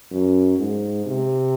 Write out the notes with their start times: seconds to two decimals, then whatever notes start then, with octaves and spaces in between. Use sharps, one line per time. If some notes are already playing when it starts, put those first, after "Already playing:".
0.11 F#2
0.58 G#2
1.06 C3